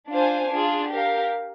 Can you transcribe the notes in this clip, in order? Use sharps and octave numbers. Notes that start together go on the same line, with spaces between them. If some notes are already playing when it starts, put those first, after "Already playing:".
D4 F4 C5 F5 G#5
D4 F4 G#4
G4 A#4 F5